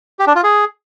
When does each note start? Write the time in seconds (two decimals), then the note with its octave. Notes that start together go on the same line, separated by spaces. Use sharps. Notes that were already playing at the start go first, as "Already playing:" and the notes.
0.19 G4
0.27 D4
0.35 F4
0.43 G#4